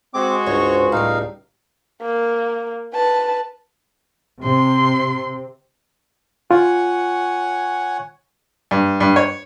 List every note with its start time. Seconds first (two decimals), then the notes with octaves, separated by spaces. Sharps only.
0.14 G#3 C4 F#4 D6
0.46 C#2 G2 C5 C#5 C#6
0.92 A2 G3 D#4 F5
2.02 A#3
2.94 B4 A5
4.43 C3 C6
6.51 F4 C#5 F#5 G#5
8.71 G2
9.00 G2
9.16 C#5